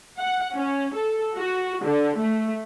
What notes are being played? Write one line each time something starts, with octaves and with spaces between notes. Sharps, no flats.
F#5
C#4
A4
F#4
D3
A3